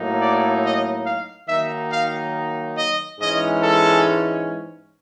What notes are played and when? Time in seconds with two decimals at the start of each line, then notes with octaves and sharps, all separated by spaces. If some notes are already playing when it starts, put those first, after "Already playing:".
Already playing: A2 F#3 A#3 D#4
0.20 D5
0.62 D#5
1.05 F5
1.48 D#3 F#3 A#3 D#4 E5
1.92 F5
2.77 D#5
3.19 G#2 E3 G#3 C#4 D#5
3.62 A4